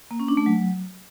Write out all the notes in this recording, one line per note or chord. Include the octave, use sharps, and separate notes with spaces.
A#3
C#4
D4
A3
F#3